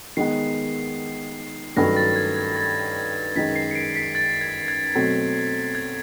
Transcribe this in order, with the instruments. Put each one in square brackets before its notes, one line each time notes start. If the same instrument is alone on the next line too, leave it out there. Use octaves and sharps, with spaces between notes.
[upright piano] D#3 G#3 B3 [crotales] C7
[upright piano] G2 D#3 F#3 A3 C#4 [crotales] A#6
[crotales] A6
G#6
G#6
A6
[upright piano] F#2 D#3 G#3 [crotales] B6
[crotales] C7
C#7
C7 D7
B6 C#7
A6
G#6
G#6
[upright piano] B2 F#3 A3 C4
[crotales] G#6